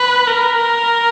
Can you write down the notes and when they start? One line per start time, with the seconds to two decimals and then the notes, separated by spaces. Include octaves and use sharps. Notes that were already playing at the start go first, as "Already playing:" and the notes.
Already playing: B4
0.28 A#4